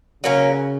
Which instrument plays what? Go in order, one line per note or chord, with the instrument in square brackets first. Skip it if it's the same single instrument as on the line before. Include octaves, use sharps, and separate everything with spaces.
[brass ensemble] C#3 [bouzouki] F#3 A#3 C#4